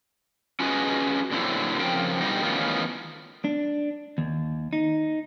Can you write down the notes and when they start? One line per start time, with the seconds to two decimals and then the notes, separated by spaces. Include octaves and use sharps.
0.60 C#4 F4 F#4 G#4 B4 D#5
1.31 A#2 D3 F#3 C4 E4
1.80 C#3 F3 C4 A#4 G5
2.21 B2 D3 G3 D#4 F#4 G4
2.42 D#3 E3 A3 B3 C#4 F4
3.44 D4
4.18 D#2
4.73 D#4